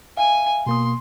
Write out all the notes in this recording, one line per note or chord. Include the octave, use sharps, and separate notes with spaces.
E5 F5 G#5
B2 A#3 C6 D#6